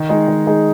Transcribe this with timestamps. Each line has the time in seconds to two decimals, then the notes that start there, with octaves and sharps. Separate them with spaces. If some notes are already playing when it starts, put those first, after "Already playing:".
Already playing: D#3
0.09 G#3 D#4 G#4
0.28 D#3
0.47 G#3 D#4 G#4